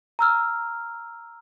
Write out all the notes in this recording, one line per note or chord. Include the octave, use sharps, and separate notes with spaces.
A#5 E6 F6